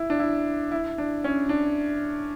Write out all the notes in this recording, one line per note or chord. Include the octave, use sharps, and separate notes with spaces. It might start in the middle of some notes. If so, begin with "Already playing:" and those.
Already playing: E4
D4
E4
E4
D4
C#4
D4